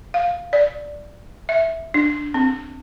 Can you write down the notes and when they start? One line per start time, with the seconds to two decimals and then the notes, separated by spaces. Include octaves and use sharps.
0.14 F5
0.53 D5
1.49 E5
1.94 D4
2.34 C4